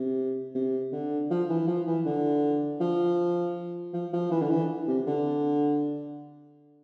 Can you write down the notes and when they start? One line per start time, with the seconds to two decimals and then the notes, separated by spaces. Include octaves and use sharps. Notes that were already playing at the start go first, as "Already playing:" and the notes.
Already playing: C3
0.55 C3
0.92 D3
1.30 F3
1.49 E3
1.67 F3
1.87 E3
2.05 D3
2.80 F3
3.94 F3
4.13 F3
4.31 E3
4.42 D3
4.50 E3
4.88 C3
5.07 D3